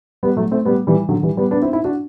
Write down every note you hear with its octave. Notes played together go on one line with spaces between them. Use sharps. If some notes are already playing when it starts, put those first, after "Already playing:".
G3 B3
F#3 A3
A3 C4
G3 B3
E3 G3
D3 F#3
E3 G3
G3 B3
B3 D4
C4 E4
C4 E4
D4 F#4